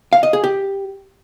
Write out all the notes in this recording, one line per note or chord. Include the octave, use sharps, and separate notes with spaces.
F5
D#5
G#4
G4